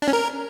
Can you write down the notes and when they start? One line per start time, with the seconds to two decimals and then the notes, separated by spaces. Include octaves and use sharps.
0.02 D4
0.08 C#4
0.13 A#4